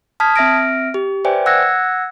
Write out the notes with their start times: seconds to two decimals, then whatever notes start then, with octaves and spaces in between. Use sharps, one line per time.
0.20 A5 D#6 F6 G#6 B6
0.36 C4 E5 F6 A#6 D7
0.94 G4
1.25 B4 C5 D5 E5 G5 G#5
1.46 F#5 E6 F#6 G#6 A#6 C#7